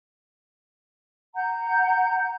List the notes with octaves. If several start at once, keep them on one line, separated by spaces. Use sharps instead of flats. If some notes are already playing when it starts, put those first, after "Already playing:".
F#5 A#5 G6